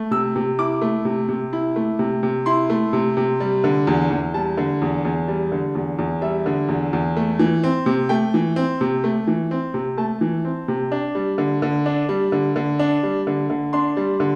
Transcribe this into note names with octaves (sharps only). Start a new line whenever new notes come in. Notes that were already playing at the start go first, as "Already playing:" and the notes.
Already playing: A3
C3 E6
C3
E4 D6
A3
C3
C3
E4
A3
C3
C3
E4 C6
A3
C3
C3
G3
D3
E2
E2
G3 A5
D3
E2
E2
G3
D3
E2
E2
G3 E5
D3
E2
E2
A3
E3
C4
C3
A3 G5
E3
C4
C3
A3
E3
C4
C3
A3 A5
E3
C4
C3
D4
G3
D3
D3
D4
G3
D3
D3
D4
G3
D3
D3
D4 C6
G3
D3